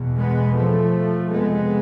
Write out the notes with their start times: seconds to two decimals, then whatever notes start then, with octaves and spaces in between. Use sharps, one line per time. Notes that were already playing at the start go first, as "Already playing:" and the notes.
Already playing: E2 B2
0.17 G#3 B3
0.56 F3 A3
1.32 F2 C3 G#3 B3